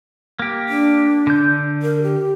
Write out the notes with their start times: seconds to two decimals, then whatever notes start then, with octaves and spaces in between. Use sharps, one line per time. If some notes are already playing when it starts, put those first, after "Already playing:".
0.39 A#3 G4
0.69 D4
1.27 D3 G6
1.83 A#4
2.03 G4